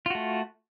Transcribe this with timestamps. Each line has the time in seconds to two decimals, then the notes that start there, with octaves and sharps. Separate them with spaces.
0.06 F4
0.10 F#4
0.15 A3